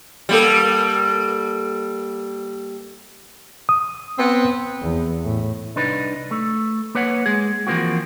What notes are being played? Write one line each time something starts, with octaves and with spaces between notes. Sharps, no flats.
G3 A#3 A4
D#6
B3 C4
E2
A2
C2 D4 D#4 B4
A3
A#3 B4 C#5 F#5
G#3 G#4
E3 F3 A#3 C4 F#4